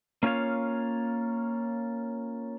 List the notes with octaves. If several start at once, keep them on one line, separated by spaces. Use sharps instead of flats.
A#3 C#4 F4 G#4 C#5 F5